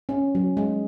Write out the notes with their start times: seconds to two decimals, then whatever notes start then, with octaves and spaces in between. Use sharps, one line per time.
0.09 C#4
0.35 F#3
0.57 G#3